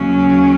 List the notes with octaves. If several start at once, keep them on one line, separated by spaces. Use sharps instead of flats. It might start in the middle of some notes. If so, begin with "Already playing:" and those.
Already playing: D#2 C#3 F#3 C#4